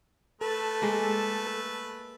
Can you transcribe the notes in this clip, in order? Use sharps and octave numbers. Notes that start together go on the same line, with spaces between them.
A3 A4 B4
G#3 A#3